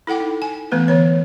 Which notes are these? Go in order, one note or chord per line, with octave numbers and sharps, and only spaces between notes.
E4 A4 F#5 G5 D6
D#4
G#5
E3 A3 B3 B4
D3 E3 C#5